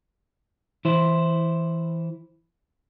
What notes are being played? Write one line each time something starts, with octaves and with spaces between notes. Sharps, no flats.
E3 E4 C5